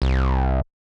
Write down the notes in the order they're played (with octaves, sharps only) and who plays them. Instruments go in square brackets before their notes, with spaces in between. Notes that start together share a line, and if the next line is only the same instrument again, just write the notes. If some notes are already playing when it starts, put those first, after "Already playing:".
[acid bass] C2